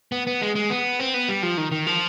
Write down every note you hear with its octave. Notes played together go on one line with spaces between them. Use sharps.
B3
B3
G#3
G#3
B3
C4
B3
G3
F3
D#3
D#3
F3